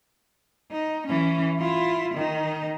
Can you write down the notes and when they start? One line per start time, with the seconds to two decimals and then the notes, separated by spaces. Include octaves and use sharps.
0.71 D#4
1.07 E3 C#4
1.59 E4 F4
2.14 D#3 D#4